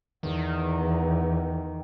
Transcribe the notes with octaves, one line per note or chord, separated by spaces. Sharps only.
E2 D#3